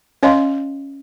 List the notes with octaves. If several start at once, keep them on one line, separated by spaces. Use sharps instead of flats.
C#4 C#5 D#5 F5 C6